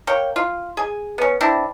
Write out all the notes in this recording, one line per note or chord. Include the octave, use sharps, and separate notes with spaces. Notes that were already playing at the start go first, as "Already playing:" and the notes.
A#3 C#5 G5
F4
G#4 G#5
B3 C#4
C4 D4 E4